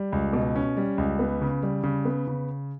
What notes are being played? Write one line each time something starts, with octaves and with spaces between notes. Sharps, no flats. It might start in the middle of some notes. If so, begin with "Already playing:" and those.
Already playing: G3
C#2
B2
C#4
G3
C#2
B3
C#3
G3
C#3
B3
C#3